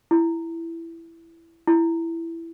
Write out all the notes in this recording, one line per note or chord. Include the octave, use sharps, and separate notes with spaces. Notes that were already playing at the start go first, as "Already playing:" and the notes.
E4
E4